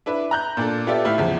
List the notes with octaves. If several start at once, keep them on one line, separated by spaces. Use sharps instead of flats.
D4 E4 B4
A#5 F#6 G6
A#2 D4 A4
B3 F4 G4 A4 D5 E5
A2 E4 F6
E2 C#3 F3